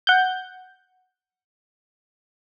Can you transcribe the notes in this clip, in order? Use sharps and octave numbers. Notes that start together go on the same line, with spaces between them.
F#5 G6